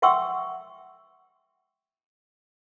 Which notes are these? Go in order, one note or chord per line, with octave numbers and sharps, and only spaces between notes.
E5 F#5 G5 C6 C#6 E6